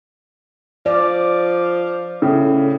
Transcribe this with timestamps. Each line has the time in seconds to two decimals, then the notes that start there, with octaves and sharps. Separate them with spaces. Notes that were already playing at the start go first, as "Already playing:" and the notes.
0.86 F3 D5
2.22 A2 C#3